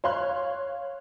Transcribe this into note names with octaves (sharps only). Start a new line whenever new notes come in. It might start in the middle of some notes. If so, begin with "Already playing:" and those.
C#5 F5 C6 F#6